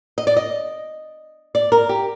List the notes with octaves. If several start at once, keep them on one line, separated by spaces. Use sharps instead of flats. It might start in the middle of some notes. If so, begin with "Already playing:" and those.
D#5
D5
D#5
D5
A#4
G4